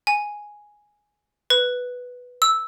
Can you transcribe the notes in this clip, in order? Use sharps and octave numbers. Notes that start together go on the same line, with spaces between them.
G#5
B4
E6